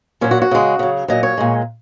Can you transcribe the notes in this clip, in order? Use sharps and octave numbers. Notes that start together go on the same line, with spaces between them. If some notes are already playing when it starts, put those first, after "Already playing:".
A#2 F#3 C#4
F#4
F#4
C#3 G#3
C#3 F#3
A#2 F#3 D#5
C#5
A#2 G#3